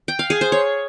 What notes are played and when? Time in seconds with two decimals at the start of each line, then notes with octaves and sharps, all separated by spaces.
0.08 G5
0.19 F5
0.30 G#4
0.41 C5
0.52 C#5